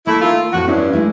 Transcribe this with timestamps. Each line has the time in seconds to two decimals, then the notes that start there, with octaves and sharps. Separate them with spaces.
0.07 A3 A#3 E4
0.21 D#3 A3 F4
0.53 F2 A2 F#4
0.68 G2 C#4 E4 C5
0.93 G#3 A3 E4